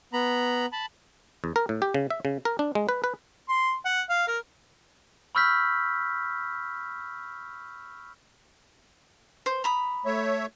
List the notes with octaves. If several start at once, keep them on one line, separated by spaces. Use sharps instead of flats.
B3 A#5 B5
A5 B5
E2
A#4
A2
G4
C#3
E5
C#3
A#4
D4
G#3
B4
B4
C6
F#5
F5
A#4
B5 C#6 E6 F6 G6 B6
C5
A#5 B5 D#6
A3 C#5 E5